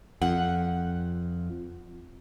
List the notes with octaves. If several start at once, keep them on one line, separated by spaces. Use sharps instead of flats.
F2 F#5